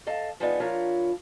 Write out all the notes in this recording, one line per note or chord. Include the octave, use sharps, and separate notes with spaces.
A4 D#5 F5 A5
F3 G#3 B3 D4 D#4
F3 D4 E4 F4 A#4 C#5